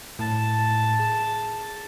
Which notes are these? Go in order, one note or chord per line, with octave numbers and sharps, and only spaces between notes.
A2 A5
G#4